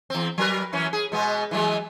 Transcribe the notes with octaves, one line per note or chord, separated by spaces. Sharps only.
E2 C4
F#3 A#4 B4
F#2 E3 C#4
G#4
B2 G#3 B3
E3 F#3 G#3